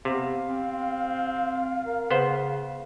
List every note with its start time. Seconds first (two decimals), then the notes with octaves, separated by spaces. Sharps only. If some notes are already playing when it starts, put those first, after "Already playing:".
0.05 C3 B3 F5
0.48 C4
1.86 A#4
2.11 C#3 B3 C5